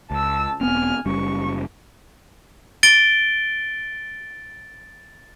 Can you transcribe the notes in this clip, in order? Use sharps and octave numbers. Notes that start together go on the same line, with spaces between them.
C#2 A5 E6
E1 B3 C4 G#5 F6
F#1 G3 C#4 C#6
A6 D7 G7